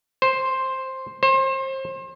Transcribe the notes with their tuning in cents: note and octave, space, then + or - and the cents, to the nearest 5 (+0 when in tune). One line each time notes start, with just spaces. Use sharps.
C5 +5
C5 +30